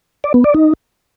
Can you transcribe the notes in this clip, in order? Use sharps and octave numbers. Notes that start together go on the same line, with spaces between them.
D5
B3
D5
D#4